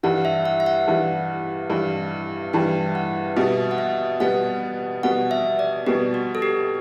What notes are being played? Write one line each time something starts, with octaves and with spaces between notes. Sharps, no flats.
G2 E3 G3 F#5
E5
F#5
E5
F#5
G2 E3 G3
G2 E3 G3
G2 E3 G3 G5
F#5
B2 G3 B3 E5
F#5
E5
B2 G3 B3 F#5
B2 G3 B3 F#5
E5
D5
B2 G3 B3 G4
F#4
A4
G4